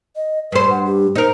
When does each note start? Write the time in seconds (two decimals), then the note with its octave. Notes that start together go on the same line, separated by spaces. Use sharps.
0.16 D#5
0.52 G2 B4 C5
0.70 F#5
0.85 G4
1.15 D#4 A#4 C5